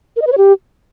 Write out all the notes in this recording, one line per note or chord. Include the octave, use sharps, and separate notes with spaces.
A#4
D#5
B4
C#5
G4